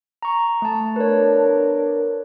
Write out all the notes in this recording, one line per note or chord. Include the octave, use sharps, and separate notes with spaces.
A#5 C#6
A3 A5
B3 D4 A#4 B4 C#5